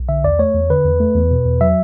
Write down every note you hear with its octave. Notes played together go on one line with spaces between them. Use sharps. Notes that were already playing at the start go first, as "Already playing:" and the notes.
Already playing: B1
D3 E5
E2 D5
A3 C#5
E2
D3 B4
E2
A3
E2
B2
E2
F#3 E5